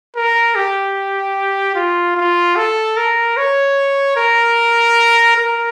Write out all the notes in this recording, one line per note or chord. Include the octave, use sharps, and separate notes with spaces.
A#4
G4
F4
F4
A4
A#4
C#5
A#4
A#4